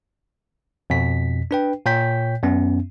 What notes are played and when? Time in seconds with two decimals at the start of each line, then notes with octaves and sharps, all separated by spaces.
0.90 F2 B2 B6
1.51 D4 B4 G5
1.86 A#2 C#5 G5 G6 B6
2.43 F#2 B3 C#4